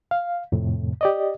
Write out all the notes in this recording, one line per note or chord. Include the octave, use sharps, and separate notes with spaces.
F5
F2 A2 C3
G4 D5 D#5